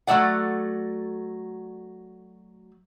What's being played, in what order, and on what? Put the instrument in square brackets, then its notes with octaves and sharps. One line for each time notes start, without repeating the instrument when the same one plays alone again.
[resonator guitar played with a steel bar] F#3 A3 A4 D5 F#5